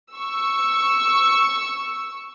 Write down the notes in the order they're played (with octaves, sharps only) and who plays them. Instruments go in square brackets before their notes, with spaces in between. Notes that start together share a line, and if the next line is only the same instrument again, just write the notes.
[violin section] C#6 E6